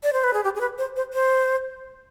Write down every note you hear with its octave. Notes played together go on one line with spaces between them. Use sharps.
D5
C5
B4
G#4
G4
G#4
B4
C5
C5
C5